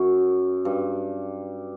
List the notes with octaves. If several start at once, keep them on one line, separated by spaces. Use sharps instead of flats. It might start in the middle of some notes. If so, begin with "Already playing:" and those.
Already playing: F#2
G2